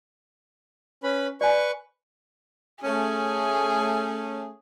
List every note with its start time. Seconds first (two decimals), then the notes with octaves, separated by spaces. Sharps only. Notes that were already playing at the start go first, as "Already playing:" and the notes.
1.04 C#4 B4 B5
1.41 B4 D5 G#5 C#6
2.84 A3 C#4 G#4